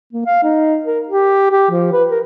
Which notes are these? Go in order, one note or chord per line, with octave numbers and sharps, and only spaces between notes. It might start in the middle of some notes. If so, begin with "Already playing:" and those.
A#3
F5
D#4
A#4
G4
G4
F3
B4
A#4